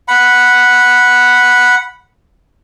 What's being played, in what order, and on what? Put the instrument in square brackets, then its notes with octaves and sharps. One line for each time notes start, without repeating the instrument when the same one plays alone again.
[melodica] F#5 B5